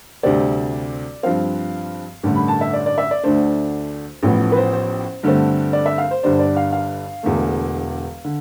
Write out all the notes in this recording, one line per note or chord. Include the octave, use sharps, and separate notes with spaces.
D2 C3 G3 C4 D5
G2 F3 C4 F5
A1 G2 D3 A3
B5
A5
E5
D5
D5
E5
D5
D2 D3 A3 D4 C5
A1 A2 F3 B3
B4
C5
C5
G2 D3 A3 C4
D5
E5
F5
C5
G1 G2 D3 G3 D4 C5
D5
F5
F5
E1 E2 D3 A3
D3